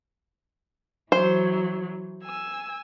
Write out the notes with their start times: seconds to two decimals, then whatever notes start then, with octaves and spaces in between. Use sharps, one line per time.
1.12 E3 F#3 C5
2.25 G#5 E6